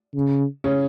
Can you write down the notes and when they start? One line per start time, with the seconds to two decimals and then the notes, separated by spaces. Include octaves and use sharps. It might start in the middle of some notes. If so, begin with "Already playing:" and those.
0.15 C#3
0.64 C#3 C#4